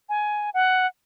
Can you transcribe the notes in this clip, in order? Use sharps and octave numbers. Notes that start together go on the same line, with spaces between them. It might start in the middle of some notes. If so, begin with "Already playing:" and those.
G#5
F#5